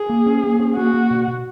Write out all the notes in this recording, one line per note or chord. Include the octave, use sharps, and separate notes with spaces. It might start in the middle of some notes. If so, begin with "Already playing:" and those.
Already playing: G#4
A#3
C#4
A#3
C#4
A#3 F#4
A#3
B2
B2